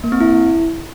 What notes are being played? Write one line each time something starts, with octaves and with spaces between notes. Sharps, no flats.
A#3
C4
E4